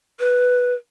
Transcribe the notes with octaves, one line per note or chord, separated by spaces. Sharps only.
B4